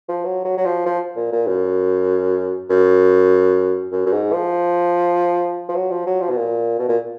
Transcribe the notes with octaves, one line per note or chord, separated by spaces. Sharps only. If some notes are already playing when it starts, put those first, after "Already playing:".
F3
F#3
F#3
F#3
F3
F3
A#2
A#2
F#2
F#2
F#2
F#2
G#2
F3
F3
F#3
F3
F#3
F3
B2
A#2
B2
A#2